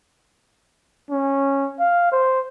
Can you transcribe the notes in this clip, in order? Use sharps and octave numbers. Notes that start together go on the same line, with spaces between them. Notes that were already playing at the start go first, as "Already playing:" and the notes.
C#4
F5
C5